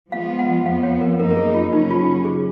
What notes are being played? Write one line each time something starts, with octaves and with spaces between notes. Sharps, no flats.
F3 G#3 B3 F4 F5
F#5
F2 F3 B3 F5
C#5
A#4
F#2 F3 A#3 D#4 A#4
A#4
G#4
F4
C#3 F#3 C#4 D#4
F4
G#4